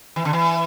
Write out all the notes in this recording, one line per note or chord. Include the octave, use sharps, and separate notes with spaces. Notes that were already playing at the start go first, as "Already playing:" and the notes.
E3
D3
E3